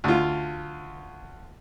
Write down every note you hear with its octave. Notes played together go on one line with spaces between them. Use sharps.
D2 F4